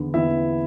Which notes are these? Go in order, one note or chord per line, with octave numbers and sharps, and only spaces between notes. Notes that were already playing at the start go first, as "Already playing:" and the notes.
Already playing: E2 D3 B3
E2 D3 B3 E4 E5